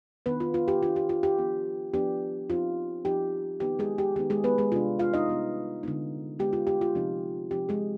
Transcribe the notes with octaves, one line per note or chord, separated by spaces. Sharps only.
D#3 B3 D4 B4
F4
F4
G4
D#3 B3 D4 F4
G4
F4
G4
F3 B3 D4
F3 B3 D4 G4
F3 C4 D#4 F4
F3 C4 D#4 G4
D#3 B3 D#4 G4
G#3 G#4
G4
D#3 B3 D#4 G4
G#3 G#4
B3 B4
G#3 G#4
C3 G3 B3 D4 F4
F4 F5
D#4 D#5
C3 G3 B3 D4
D3 G#3 B3 D#4
D3 G#3 B3 D#4 G4
F4
G4
F4
C3 F3 C4 D#4
C3 F3 C4 D#4 G4
G#3 G#4